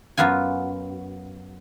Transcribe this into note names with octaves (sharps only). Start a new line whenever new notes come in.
F#2 B3 F4 G#5